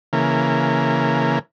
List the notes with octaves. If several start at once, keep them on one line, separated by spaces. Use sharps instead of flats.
C#3 E3 A#3